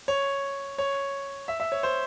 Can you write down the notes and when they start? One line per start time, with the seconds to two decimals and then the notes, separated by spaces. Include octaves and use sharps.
0.08 C#5
0.78 C#5
1.48 E5
1.60 E5
1.72 C#5
1.83 C5